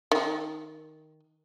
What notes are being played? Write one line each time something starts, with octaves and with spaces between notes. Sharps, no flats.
D#3